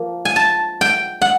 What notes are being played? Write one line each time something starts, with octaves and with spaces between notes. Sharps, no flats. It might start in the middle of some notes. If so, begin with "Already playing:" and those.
Already playing: F3 A#3
G#5
A5
G5
F#5